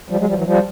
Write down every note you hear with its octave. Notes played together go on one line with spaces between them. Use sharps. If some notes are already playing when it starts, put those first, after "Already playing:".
F3 G3
F#3 G#3
F3 G3
E3 F#3
F3 G3